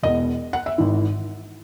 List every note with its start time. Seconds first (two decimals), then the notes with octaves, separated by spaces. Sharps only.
0.03 E1 E2 B2 D#5
0.53 F#5
0.66 E5
0.78 G#1 G#2 E3